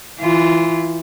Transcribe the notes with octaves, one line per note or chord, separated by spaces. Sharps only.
E3 F4